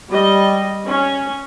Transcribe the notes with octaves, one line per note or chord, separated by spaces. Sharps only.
G3 D#5
C#4